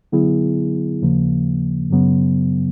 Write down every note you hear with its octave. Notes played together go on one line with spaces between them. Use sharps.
D3 F#3 B3 E4 G#4
D#2 C#3 F3 A#3
F#2 C#3 F#3 B3